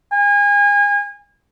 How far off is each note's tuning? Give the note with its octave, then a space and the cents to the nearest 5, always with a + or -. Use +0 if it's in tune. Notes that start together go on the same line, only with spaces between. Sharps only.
G#5 -30